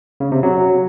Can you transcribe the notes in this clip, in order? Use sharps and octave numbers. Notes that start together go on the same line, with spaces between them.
C#3
C3
F#3